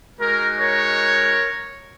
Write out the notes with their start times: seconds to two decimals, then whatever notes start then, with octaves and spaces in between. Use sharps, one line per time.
0.19 G#3 D#4 F#4 A#4
0.60 A#4 C#5